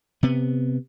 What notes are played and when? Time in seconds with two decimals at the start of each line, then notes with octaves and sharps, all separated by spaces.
0.23 C3 B3